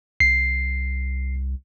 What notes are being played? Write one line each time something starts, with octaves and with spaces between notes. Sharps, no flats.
C2 C7